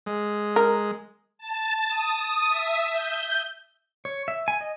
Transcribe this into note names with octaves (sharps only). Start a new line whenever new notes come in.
G#3
A#4
A5
D#6
E5
G6
C#5
E5
G#5
D#5